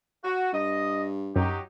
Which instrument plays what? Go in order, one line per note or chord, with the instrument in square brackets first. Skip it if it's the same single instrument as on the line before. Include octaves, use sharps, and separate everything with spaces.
[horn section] F#4
[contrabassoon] G2 [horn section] D#5
[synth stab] F#2 [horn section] F#3 D#4 G4